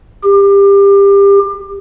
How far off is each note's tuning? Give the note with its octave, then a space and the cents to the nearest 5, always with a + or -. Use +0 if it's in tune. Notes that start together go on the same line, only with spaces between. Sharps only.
G4 +25